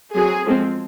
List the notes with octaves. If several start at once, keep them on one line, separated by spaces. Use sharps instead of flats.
F#3 C4 G#4
F3 G#3 C4